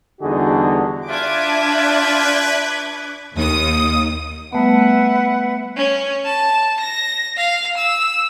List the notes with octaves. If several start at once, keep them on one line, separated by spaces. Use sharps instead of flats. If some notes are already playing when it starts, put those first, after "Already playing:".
E2 D3 G3 D#4 F#4 G#4
D4 F4 B4 E5 D6 G#6
D#2 D#6
G3 A3 B3 B4 E5 F#5
C#4
A5
A#6
F5
E6